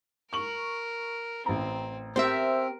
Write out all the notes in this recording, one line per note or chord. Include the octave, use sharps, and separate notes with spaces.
A#4 C#6 F#7
A1 C4 A#5
C4 G4 A#4 C5 E5